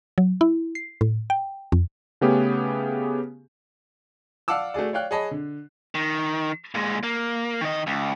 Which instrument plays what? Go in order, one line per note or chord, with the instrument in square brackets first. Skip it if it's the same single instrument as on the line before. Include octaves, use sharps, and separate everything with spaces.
[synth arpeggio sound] F#3
E4
C7
A2
G5
F2
[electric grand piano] C#3 A3 B3 C#4 G4 G#4
[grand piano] D5 F5 F#5 A5 D6 E6
A3 F#4 G#4 D5
C#5 D5 F5 G5 F#6
G#4 C#5 D#5 A5 B5
D3
[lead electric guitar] D#3
A#2 G#3
A#3
D#3 D#5
C#2